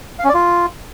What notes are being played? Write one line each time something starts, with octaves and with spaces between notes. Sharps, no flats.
F5
C#4
D5
F4